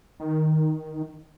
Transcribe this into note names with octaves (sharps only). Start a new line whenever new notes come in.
D#3